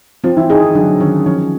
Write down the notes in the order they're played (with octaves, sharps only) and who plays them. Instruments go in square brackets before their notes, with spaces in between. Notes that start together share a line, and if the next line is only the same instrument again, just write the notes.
[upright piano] F3 F4 [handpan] C4
[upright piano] E3 E4
[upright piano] D#3 D#4 [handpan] G#4
[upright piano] D#3 D#4
[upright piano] D3 D4 [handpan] F#3
[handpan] D#3 [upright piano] C#4
[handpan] F3 [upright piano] C#4